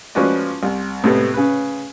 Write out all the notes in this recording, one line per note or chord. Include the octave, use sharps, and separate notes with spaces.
F3 G#3 C#4 F#4 B4 D5
C2
A2 C3 G#3 B3
C#3 B4